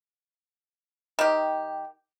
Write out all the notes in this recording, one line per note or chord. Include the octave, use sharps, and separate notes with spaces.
D#3 G4